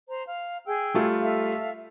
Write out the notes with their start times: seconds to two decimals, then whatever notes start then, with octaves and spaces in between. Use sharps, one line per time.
0.09 C5 A#5
0.26 F5
0.66 G#4 G5 E6
0.94 G3 A3 F4
1.21 A4 E5 F5